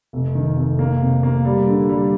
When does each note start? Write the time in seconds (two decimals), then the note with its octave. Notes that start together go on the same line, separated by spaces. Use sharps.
0.13 F1
0.35 D#3
0.57 F1
0.79 A#3
1.01 C3
1.23 A#3
1.45 G3
1.67 D3
1.89 G3